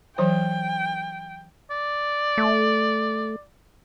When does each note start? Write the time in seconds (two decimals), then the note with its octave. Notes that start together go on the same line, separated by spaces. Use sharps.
0.18 E3 F#3 C5 G5
1.70 D5
2.38 A3